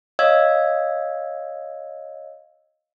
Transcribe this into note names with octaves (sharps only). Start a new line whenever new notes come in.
C#5 D#5 F5 E6 G#6